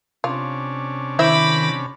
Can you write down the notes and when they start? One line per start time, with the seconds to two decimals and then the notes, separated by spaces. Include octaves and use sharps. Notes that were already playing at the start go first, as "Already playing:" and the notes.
0.24 C3 C#4 D4 F4
1.19 D#3 E4 C5 E5 B5 D6 G6 A#6